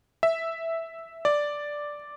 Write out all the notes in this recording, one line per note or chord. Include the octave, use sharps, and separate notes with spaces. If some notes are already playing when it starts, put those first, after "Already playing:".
E5
D5